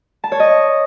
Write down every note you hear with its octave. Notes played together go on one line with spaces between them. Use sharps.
A5
C#5
D#5